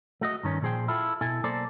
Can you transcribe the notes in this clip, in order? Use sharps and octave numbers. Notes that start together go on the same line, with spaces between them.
A3 F#4 D#5
G2 D#3 C#4
A#2 F3 G#4 C5 G5
E4 F4 A4
B2 E4 A4 G#5
B1 A#3 A4 C5 D5